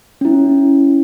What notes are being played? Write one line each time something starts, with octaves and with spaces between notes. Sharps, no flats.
C#4 E4